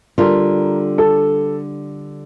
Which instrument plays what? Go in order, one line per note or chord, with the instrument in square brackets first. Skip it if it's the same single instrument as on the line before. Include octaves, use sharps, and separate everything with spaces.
[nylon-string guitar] D3 G3 D4 F4 [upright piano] A#4
[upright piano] A4